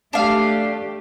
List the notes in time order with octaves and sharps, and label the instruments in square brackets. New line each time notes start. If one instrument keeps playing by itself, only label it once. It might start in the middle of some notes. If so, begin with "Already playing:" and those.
[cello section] A3 G4 [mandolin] D4 F5